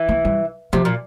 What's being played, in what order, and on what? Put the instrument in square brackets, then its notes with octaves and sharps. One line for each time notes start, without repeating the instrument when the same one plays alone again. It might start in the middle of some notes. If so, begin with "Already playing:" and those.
Already playing: [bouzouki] E3
[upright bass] A#3
G3
[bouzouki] C3 [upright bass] F3
[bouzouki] A#2